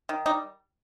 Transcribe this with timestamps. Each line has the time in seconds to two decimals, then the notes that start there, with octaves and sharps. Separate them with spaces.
0.09 D#3
0.26 G3 D#4